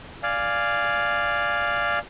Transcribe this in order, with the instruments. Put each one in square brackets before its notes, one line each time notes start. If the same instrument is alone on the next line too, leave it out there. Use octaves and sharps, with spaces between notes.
[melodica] D5 F5 G#5